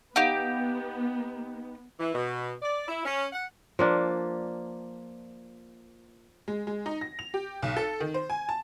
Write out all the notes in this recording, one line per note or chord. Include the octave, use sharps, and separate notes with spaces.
B3 D#4 G4 F5 F#5
E3
B2
D5
E4
C#4
F#5
F3 A#3 D4
G#3
G#3
D#4
A#6
F7
G4
B1
A4
D#3
C5
G#5
A5